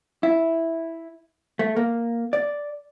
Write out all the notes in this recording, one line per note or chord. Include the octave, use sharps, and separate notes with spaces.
E4
A3
A#3
D5